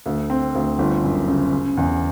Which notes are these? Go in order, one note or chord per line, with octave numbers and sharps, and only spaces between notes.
D2
C4
D2
G1
F#2
C#3
C#3
E2